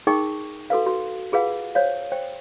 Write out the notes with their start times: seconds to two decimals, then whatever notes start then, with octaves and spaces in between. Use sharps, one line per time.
0.07 D#4 G#4 A#4 G5 C#6 D6
0.70 F#4 A4 B4 F5
0.86 F#4
1.32 F4 G#4 B4 F5 F#5
1.75 C5 C#5 F5
2.12 C5 G5